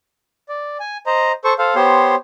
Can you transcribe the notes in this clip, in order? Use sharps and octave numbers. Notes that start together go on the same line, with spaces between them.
D5
G#5
C5 D#5 A#5
A4 C5 C#6
A4 C5 F5
B3 G4 C5 C#5 C6